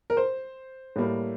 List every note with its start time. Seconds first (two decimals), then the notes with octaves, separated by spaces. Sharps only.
0.10 A#4
0.17 C5
0.96 A2 G3 A#3